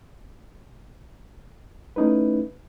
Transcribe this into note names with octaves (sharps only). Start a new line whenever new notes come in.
A3 C#4 D#4 E4 B4